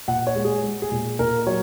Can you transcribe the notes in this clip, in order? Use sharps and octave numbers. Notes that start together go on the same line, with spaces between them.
A#2 F#5
C#5
G#3
G#4
G#3
G#4
A#2
A#2 A#4
F#3 C#5